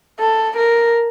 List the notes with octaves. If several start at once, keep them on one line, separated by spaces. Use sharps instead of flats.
A4
A#4